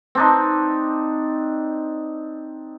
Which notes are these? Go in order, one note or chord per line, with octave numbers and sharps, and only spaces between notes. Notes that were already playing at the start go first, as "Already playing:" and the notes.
C4 D4 D#4